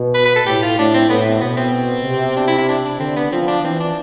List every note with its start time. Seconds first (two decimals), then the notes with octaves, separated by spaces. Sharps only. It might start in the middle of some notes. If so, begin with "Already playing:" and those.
Already playing: B2
0.14 B4
0.25 B4
0.36 A4
0.46 A2 G4
0.63 F4
0.78 A2 D4
0.94 C4
1.10 A2 B3
1.26 C4
1.41 B2 B3
1.57 C4
2.04 C3
2.36 D4
2.47 E4
2.58 E4
2.68 D4
2.84 D4
3.00 D3 C4
3.16 B3
3.32 F3 C4
3.48 D4
3.63 E3 C4
3.80 D4